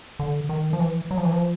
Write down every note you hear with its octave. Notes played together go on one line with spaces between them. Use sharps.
D3
D#3
F3
E3
F#3
F3
E3
F3